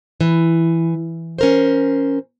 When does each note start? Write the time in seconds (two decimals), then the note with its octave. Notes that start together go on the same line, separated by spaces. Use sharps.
0.21 E3
1.38 C#4 A#4 C5